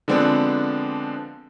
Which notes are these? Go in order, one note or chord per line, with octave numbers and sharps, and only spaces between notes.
D3 F3 G#3 B3 C4 D4